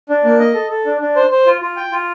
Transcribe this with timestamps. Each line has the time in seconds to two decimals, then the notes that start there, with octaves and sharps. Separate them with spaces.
0.09 D4
0.24 A#3
0.39 D#5
0.54 A4
0.70 A4
0.85 D4
1.01 D4
1.16 C5
1.31 C5
1.46 F4
1.61 F4
1.76 G5
1.92 F4